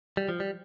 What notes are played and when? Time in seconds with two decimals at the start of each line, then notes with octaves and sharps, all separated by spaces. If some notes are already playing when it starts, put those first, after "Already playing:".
0.17 G3
0.29 F3
0.40 G3